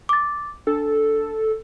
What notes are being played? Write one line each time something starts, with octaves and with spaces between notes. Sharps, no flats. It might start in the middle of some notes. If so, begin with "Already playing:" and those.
D6 A6
D4 A4